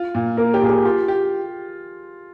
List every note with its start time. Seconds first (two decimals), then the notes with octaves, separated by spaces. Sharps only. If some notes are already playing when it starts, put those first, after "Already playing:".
Already playing: F4
0.15 A#2
0.37 A#3 A#4
0.54 G4
0.62 A#2 G#4
0.69 G4
0.85 F4 G4
1.08 G4